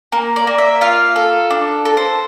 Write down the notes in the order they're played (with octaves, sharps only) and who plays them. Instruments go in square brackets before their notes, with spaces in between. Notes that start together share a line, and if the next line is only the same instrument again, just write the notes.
[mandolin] A#3
D5
A#3
E5
F4 F5
A4
D4
A4
C5